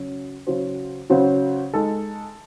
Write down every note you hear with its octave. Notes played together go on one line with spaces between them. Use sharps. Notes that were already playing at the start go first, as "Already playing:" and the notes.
Already playing: C#3 F#3 C#4 F#4
C#3 F#3 C#4 F#4 C5
C#3 F#3 C#4 F#4 C5
G#3 D#4 A4